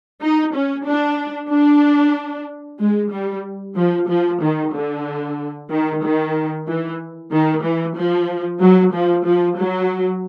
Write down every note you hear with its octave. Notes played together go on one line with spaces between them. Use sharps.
D#4
C#4
D4
D4
G#3
G3
F3
F3
D#3
D3
D#3
D#3
E3
D#3
E3
F3
F#3
F3
F3
F#3